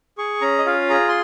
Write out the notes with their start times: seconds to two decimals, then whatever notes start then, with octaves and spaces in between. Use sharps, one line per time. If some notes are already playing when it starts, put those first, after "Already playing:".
0.18 G#4 C#6
0.41 C#4 A#5
0.59 D#5
0.66 F4 F5
0.89 G#4 A#5
1.08 C6